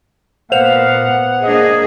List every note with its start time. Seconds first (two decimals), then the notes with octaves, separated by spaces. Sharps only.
0.52 A#2 B3 C5 F5 F#5 F7
1.43 A#3 D4 G#4 D#5